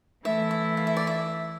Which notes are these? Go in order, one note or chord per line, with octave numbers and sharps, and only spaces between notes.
E3 A3 E4 E5
E5
F5
E5
D5
E5